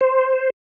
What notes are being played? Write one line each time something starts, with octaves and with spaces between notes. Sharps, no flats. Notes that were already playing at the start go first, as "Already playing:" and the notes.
C5